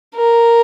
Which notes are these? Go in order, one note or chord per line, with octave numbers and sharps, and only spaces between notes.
A#4